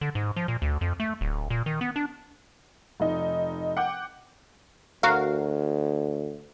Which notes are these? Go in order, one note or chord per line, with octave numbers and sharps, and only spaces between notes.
D3
G#2
F3
A#2
D2
F2
A3
D1
A#2
D#3
B3
D4
F1 D#4
F#5 G5 D6 G6
D2 F#4 A#4 F5